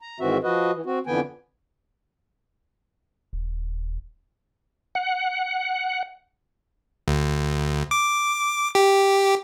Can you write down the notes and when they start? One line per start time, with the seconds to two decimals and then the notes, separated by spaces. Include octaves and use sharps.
0.01 A#5
0.20 G#2 D#3 E3 C4 F#4 E5
0.43 F3 F#4 B4 D#5
0.74 E3
0.86 C4 F#4
1.06 F2 D3 E3 B3 G5 G#5
3.33 D#1
4.95 F#5
7.08 D2
7.91 D6
8.75 G4